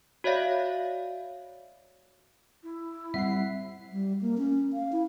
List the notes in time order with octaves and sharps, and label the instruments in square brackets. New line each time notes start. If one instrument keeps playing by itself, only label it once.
[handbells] F#4 C#5 D5 E5 F5
[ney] E4
[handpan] G3 C4 F#5 [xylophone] E5 C7
[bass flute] G3
A#3
C#4
F5
E4